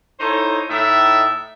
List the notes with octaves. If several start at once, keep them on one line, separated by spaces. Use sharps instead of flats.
D#4 E4 A4 C5 C#5
A2 D#4 E5